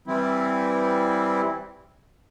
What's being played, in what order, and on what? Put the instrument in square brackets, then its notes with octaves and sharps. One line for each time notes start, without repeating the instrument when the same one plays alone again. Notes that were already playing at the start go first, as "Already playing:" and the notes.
[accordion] E3 G3 C4 E4